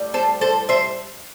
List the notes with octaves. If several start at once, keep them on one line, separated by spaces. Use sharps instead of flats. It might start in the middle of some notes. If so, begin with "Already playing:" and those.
Already playing: A2 G3
A4 C5
A4 C5
C5 E5